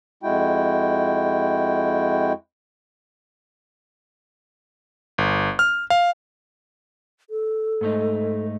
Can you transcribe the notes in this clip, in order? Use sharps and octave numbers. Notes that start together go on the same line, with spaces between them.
F2 G#3 E4 F#4 G5
G1
F6
F5
A4
G#2 A3 D#4